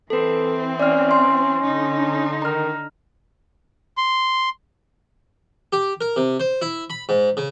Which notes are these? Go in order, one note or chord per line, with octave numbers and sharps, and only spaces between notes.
E3 C4 A4 B4
C#4 D5 F6
C6
D3 D#4
D#3 A#5 F6
C6
G4
A#4
C3
C5
E4
B5
G#2
C#3